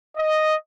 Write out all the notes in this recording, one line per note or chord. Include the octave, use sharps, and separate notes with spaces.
D#5